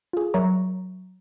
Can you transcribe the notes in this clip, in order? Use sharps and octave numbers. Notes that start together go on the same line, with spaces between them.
F4 G#4
F#3 A#4 C#5 E5 A#5 C#6